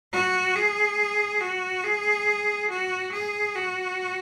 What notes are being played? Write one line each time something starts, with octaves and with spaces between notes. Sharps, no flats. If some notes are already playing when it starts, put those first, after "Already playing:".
F#4
G#4
F#4
G#4
F#4
G#4
F#4